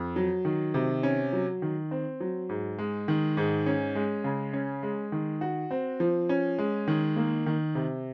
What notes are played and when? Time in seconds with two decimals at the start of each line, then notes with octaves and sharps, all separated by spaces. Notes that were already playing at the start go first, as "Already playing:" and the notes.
Already playing: F2
0.16 F#3
0.45 D#3
0.74 C3
1.03 C#4
1.33 F#3
1.62 D#3
1.91 C4
2.20 F#3
2.49 G#2
2.78 G#3
3.08 D#3
3.37 G#2
3.66 C#4
3.95 G#3
4.24 C#3
4.53 C#4
4.83 G#3
5.12 D#3
5.41 F#4
5.71 C4
6.00 F3
6.29 C#4
6.58 G#3
6.88 D#3
7.16 A#3
7.46 D#3
7.75 C3